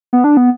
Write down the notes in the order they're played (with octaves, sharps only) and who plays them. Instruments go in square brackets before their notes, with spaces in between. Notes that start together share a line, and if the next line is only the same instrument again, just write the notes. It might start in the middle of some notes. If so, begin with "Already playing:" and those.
[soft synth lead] B3
D4
B3